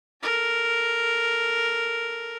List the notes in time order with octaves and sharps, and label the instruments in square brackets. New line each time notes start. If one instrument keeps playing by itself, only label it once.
[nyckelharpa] A4 A#4